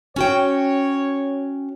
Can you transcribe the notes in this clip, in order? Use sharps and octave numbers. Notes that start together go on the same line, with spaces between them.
C#4 F#4 C#5 G5